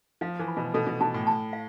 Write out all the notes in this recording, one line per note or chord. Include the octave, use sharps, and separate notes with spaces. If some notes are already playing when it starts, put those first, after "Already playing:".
F3 F5
E3
B5
B2
B2 A4
B2
B2 A5
A2
A5
F5